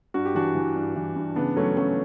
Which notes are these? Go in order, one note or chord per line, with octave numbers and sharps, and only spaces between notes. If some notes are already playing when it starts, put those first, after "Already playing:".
G2 F#4
G4
E3 D4 F#4
E3
G2
E3
G2
C#3 B3 D4
F#3 A3 C#4
F#3 A3 C#4